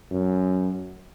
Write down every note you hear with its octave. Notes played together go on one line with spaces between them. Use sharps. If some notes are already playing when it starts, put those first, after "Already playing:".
F#2